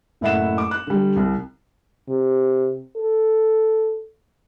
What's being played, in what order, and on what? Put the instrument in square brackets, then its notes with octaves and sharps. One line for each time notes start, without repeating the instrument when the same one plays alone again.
[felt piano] F#1 A2 E4 E5 F#5 E7
D6
F#6
D3 G3
C2
[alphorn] C3
A4